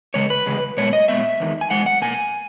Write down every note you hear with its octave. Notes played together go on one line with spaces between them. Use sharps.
E2 C#3 G#3 C#5
B4
E2 C#3 G#3
A#2 G#3 B3 C#5
D#5
A#2 G#3 B3 E5
E2 D#3 G#3
G#5
E2 D#3 G#3 F#5
F#5
B2 A#3 G#5